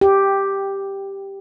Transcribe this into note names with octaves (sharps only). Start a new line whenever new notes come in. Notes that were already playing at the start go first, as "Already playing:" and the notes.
G4